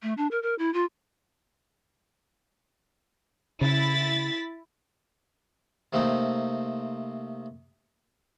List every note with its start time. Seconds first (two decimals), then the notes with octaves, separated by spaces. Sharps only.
0.03 A3
0.17 D4
0.31 A#4
0.42 A#4
0.59 E4
0.74 F4
3.61 C#3 E4 A6 B6
5.93 C3 A3 A#3 C4 D#4